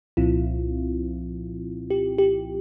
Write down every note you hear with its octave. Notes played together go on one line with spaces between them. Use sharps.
C2 A#2 F3 C4 E4 F4
G4
G4